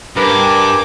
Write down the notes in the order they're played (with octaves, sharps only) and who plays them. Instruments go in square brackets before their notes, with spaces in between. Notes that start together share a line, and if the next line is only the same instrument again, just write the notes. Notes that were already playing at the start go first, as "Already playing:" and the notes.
[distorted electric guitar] G2 [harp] A#4 B4 [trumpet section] G#5 D6